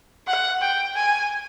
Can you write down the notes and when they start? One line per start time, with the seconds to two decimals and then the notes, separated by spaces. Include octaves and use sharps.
0.27 F#5
0.62 G5
0.96 G#5